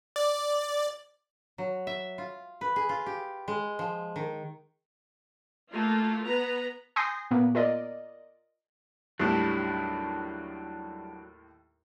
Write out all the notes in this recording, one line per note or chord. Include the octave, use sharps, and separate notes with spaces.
D5
F#3
E5
F4
B4
G#4
F4
G4
G#3
F3
D#3
A3 A#3 F4
B3 B4 A#5
G#5 C6 D#6 G6 A#6 C7
A#2 A#3 B3
F4 A#4 D5 D#5
D#2 A2 F#3 G3 D4 E4